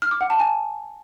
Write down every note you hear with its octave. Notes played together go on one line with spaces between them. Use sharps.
F6
D6
F#5
A5
G#5